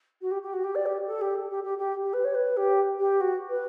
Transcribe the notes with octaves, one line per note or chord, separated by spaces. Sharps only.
F#4
G4
G4
F#4
G4
D5
G4
A4
G4
A4
G4
G4
G4
G4
B4
C#5
B4
G4
G4
F#4
B4